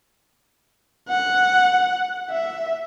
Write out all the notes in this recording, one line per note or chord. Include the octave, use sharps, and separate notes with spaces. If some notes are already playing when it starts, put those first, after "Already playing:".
F#5
E5